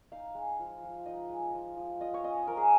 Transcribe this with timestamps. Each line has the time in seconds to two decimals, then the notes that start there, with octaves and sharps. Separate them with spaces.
0.12 D#4 F5
0.35 G#3
0.59 F3
0.83 F3
1.06 D#4 D#5
1.29 G#3
1.54 F3
1.77 F3
2.01 F4 D#5
2.14 C#5
2.24 C#4 D#5
2.47 F3 A#4
2.57 G#4